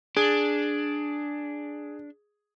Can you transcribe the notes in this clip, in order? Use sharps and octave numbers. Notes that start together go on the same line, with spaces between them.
D4 G#4